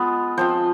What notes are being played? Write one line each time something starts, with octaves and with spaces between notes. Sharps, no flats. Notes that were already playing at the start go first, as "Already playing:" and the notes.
Already playing: G#3 B3 F4
F3 C4 F4 C5